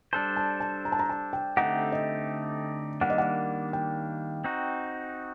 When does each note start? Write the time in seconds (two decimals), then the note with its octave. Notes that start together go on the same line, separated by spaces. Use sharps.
0.13 G3 D4 A4 C5 A5
0.37 A5
0.60 A5
0.85 A#5
0.92 A5
0.99 A#5
1.09 A5
1.33 G5
1.57 D3 A3 C4 D#4 G4 F#5
1.92 D#5
3.01 D#3 G3 A#3 D4 F#5
3.10 D#5
3.18 F#5
3.73 G5
4.44 C4 D#4 F#4